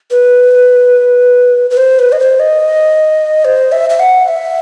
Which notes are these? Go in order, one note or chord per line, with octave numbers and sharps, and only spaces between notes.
B4
B4
C5
B4
D#5
C5
D#5
C5
E5
E5
F#5
E5